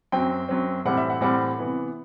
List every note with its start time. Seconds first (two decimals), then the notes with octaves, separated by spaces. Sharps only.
0.12 F#2 F#3 C4 G5
0.48 F#2 F#3 C4
0.85 A2 E3 G3 C4 F#5
0.97 E5
1.10 F#5
1.21 A2 E3 G3 C4 F#5
1.58 C3 E3 B3